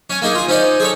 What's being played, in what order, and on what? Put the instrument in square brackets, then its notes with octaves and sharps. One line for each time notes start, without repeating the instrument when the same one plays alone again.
[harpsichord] C#4 G#5
A#3 D#4 G#4
F4 G#4
[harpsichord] C#4 D#4 D5 [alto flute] C5
[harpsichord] G#4 A4 C#5